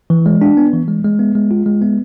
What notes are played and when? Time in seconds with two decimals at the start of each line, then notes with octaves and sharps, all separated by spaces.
0.10 E3
0.26 G#3
0.41 D4
0.57 B3
0.73 E3
0.88 G#3
1.04 G#3
1.19 B3
1.35 G#3
1.51 F4
1.66 G#3
1.82 B3